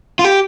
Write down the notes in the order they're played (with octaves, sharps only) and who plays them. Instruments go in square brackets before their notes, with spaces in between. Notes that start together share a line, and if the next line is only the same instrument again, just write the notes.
[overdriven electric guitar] F4
G4